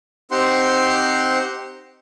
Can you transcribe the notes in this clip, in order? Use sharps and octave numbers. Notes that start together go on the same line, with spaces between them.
C4 D#4 G4 C5 F#5 C6